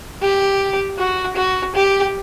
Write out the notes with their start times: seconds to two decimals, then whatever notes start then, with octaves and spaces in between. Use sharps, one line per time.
0.22 G4
0.98 F#4
1.36 F#4
1.75 G4